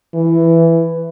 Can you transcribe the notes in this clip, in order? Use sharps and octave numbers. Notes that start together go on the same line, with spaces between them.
E3